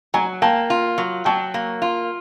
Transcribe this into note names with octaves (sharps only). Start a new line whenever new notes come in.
F#3 G#5 A#5
A#3 G5 A5
F4
F#3
F#3 G5 A5
A#3
F4